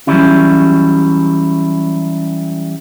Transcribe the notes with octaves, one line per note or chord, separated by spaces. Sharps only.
E3 F#3 G3 C#4 E4